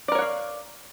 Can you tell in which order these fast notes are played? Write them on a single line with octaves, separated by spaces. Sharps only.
D5 A#4 C#5 F#5 F5